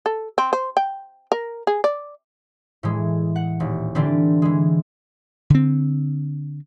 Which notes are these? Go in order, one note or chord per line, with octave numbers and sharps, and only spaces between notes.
A4
C4
C5
G5
A#4
G#4
D5
A2 E3 G#3
F#5
D#1
D3 E3 G3 C4 D4
E3 G#3
D3 C4